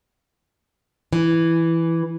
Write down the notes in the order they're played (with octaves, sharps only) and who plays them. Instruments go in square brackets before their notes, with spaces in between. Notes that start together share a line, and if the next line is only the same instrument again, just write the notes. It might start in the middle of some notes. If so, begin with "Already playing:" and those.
[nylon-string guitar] E3